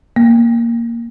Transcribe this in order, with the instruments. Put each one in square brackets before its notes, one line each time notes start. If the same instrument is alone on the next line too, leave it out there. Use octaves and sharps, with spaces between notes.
[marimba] A#3